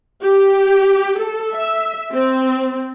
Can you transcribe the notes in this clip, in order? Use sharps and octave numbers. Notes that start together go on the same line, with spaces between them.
G4
A4
E5
C4